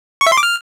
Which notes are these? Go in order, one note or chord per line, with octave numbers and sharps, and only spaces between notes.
C#6
E5
C6
D6
F6